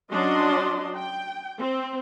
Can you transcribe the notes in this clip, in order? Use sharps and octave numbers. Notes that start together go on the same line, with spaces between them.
F#3 C#4 D4 D#5 C6
G5
C4